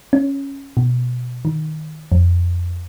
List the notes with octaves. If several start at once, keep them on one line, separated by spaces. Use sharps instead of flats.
C#4
B2
D#3
F2